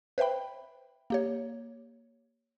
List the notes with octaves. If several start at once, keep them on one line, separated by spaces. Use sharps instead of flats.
B4 C5 E5 G5 B5
A#3 G4 C#5